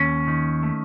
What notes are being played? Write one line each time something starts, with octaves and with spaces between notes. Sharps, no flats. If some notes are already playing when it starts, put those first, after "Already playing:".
Already playing: D#2 C#4
D#3
A3